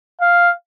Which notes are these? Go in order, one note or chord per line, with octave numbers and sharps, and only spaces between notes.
F5